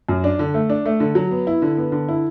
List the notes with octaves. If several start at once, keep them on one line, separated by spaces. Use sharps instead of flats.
F#2
D4
D3
A3
D4
A3
D3
F#3
B3
E4
D3
B3
D3
E4